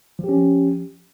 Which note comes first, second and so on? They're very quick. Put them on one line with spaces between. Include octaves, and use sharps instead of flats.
F3 G4 C#4